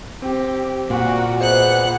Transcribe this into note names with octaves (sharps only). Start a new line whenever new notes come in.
C4 G4
A#2 F#4 A#4
B3 G#4 C5 D#5 F#5 F#6 C#7